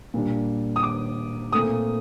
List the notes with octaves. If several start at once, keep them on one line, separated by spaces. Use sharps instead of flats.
A#2 G3 D4
D#6
D6
A#2 A3 C4 D#6